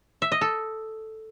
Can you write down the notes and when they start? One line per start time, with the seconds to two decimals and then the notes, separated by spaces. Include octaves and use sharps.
0.22 E5
0.32 D#5
0.41 A4